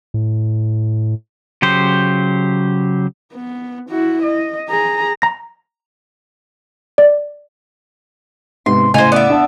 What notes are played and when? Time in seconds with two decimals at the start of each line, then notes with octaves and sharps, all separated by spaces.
0.14 A2
1.62 C#3 F#3 G4 C5
3.33 B3
3.90 E4 F#4
4.23 D#5
4.69 G#4 A#5
5.22 A#5 A#6
6.98 D5
8.66 G#2 C3 B3 C6
8.94 A2 C#3 D#4 F4 C5 G#5 F7
9.12 B3 D5 E5
9.30 D4 F#5 A5